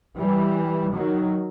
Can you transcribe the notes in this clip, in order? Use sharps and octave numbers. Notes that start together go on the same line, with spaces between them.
E3 G3
D#3 F#3